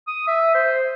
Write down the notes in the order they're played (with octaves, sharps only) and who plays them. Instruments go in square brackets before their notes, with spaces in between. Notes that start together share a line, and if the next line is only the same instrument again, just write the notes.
[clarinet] D#6
E5
C5